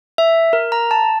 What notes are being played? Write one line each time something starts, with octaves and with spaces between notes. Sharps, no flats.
E5
A#4
A#5
A5